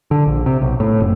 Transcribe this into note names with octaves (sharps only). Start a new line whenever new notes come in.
D3
A#1
C3
B1
A2
F#1